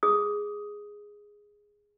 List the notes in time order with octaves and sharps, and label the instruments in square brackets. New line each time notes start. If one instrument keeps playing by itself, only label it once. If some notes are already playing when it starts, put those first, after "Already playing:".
[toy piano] G#4 D#6